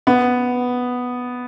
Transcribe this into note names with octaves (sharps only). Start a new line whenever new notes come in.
B3